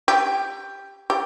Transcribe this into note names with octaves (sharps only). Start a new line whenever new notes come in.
G4
G4